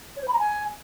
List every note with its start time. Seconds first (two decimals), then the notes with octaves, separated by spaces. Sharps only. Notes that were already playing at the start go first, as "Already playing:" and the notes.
0.17 C#5
0.22 C5
0.28 B5
0.33 A#5
0.39 G#5